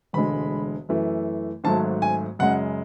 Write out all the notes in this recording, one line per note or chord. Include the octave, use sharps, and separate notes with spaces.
E1 D2 D3 G#3 B5
F#2 E3 A3
G#1 G#2 F#3 A3 A5
G#5
F#2 C#3 G#3 F#5